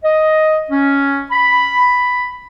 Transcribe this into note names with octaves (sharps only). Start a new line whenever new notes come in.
D#5
C#4
B5